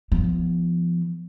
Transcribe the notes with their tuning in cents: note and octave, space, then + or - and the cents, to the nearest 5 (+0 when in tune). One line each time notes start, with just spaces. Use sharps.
F3 -25 B3 +0